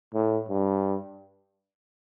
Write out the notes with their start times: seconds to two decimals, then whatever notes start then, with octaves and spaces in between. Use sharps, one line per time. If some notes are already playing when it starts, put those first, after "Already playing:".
0.14 A2
0.49 G2